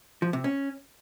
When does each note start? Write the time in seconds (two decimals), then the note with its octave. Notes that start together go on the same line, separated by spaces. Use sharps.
0.22 F3
0.33 C3
0.44 C#4